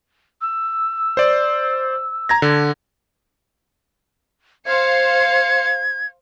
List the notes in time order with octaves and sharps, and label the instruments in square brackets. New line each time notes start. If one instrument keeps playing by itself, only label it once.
[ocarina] E6
[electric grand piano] C5 D5
A#5 G#6 A#6
D3
[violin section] C5 F5 C#7 [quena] G#6